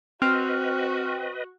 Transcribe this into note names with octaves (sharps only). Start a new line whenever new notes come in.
C4 F#4 B4 D#5 F6